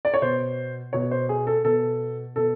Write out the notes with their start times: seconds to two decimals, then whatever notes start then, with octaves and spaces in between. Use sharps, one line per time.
0.05 D5
0.14 C#5
0.22 B2 C5
0.93 B2 C#5
1.11 C5
1.29 G#4
1.47 A4
1.65 B2 A4
2.36 B2 A4